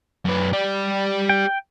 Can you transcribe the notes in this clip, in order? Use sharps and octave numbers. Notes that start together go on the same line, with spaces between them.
F#2 B4
G4 D5
G5